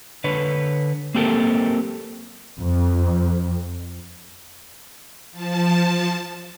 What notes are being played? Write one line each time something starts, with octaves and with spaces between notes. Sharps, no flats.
D3 B4 C#5
A#3 C4 G4 A4 A#4
F2
F3 A5